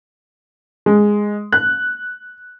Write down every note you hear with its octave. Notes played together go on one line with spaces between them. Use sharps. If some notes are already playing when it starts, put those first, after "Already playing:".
G#3
F#6